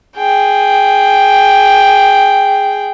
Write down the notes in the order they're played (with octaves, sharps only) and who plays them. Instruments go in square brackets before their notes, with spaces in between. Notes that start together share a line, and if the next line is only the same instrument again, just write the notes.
[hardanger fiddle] G#4 G5